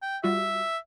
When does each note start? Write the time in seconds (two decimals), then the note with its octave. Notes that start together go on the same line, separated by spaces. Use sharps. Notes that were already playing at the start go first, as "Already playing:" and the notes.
0.02 G5
0.24 G3 F4 F#4 E5